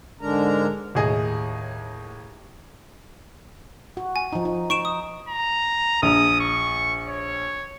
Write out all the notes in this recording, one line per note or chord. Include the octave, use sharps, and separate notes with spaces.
G#2 D3 G#3 D4 A#4 A#5
D#2 A2 G#4 D#5
F#4
G#5
F3 D#4
D#4
D#4 C#6 D7 E7
D#6
A#5
A#1 D#6
C#6
C#5